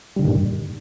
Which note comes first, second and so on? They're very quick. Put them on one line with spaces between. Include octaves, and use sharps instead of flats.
G3 D3 D#3 A#2 G2